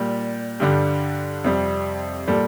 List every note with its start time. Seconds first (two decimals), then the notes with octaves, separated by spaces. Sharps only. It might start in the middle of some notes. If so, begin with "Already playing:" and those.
Already playing: A#2 G3 G4
0.60 G2 D3 G3
1.44 F2 C3 G3
2.28 A#2 G3 A4